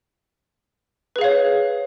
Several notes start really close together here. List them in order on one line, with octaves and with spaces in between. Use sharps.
B4 G#4 F5 C#5